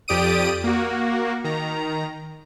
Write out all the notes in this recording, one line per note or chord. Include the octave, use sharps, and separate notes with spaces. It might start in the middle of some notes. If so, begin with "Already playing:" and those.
F2 G4 D5 D#6 D7 D#7
A#3 F#4
D#3 A#5